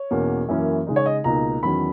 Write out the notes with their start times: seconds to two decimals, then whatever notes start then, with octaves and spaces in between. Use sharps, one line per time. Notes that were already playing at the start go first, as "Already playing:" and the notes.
Already playing: C#5
0.11 E2 B2 A#3 C#4
0.48 F#2 E3 A#3 C#4 E4
0.87 C#3 G#3 D#4
0.96 C#5
1.06 D#5
1.24 C#2 B2 A#3 D#4 A#5
1.63 E2 D#3 F#3 C#4 B5